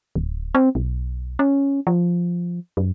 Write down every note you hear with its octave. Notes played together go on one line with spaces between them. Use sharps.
D1
C4
B1
C#4
F3
F#2